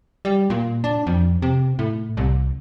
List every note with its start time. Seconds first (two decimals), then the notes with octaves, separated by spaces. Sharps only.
0.25 G3
0.50 A#2
0.84 D4
1.07 F2
1.42 C3
1.79 A2
2.17 C2